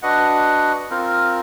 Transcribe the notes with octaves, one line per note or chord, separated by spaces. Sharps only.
D4 F#4 B4 D#5 F#5
C4 F4 A#4